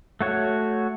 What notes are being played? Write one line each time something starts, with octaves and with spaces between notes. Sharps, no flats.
A3 F#4 C#5